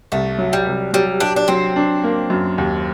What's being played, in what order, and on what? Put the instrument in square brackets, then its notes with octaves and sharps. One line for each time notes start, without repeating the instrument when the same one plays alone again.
[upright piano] C2 [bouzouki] A3
[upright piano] F#3
[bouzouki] G3
[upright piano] C2
[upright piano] F#3 [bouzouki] G3
[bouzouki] D4 [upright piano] G4
[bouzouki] D4
[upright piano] F#3 [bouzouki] C4
[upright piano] D4
A#3
F#2
D#2